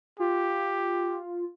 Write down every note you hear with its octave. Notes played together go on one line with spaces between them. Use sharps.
F4 G4